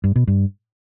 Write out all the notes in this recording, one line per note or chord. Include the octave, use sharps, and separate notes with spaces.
G2
B2
G2